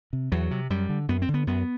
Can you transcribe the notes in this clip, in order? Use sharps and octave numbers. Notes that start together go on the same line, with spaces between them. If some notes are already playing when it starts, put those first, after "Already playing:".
C3
E2 F#3
C3
F#2 G3
D3
F#2 B3
C4
D3
B3
F#2 B3